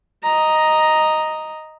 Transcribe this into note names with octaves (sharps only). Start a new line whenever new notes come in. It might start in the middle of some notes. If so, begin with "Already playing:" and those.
D#5 A#5